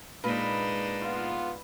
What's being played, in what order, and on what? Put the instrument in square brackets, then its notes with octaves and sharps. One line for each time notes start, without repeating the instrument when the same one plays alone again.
[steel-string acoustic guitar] A#2 [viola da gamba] G#3 D4 D#4 [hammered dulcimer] B4
[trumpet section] B3 F4